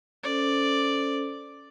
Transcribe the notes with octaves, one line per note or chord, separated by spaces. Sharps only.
C#4 A4 C5 D5